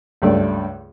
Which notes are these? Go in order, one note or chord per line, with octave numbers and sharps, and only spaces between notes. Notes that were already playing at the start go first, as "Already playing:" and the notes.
C#2 G2 A3 D5